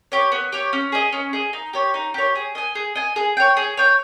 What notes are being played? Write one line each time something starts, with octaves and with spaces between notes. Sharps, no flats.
G4 C#5
B3
G4 C#5
C#4
G#4 D#5
C#4
G#4 D#5
D#4
G4 C#5
D#4
G4 C#5
G#4
D#5 G#5
G#4
D#5 G#5
G#4
C#5 G5
G#4
C#5 G5